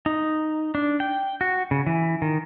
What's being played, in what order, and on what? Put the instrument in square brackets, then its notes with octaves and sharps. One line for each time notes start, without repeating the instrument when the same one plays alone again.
[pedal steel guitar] D#4
D4
G5
F#4
C#3
E3
D#3